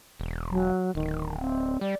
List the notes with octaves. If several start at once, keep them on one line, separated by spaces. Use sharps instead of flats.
E1
F#3
D1 D#3
C4
G3 D5